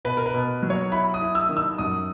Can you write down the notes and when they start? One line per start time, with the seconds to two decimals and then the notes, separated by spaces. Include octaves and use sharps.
0.05 B2 B4
0.17 A#4
0.26 B4
0.34 B2
0.62 F#3
0.70 C#5
0.92 E4 B5
1.14 D#6
1.21 E4
1.35 E6
1.49 D#3
1.57 E6
1.78 F#2 D#6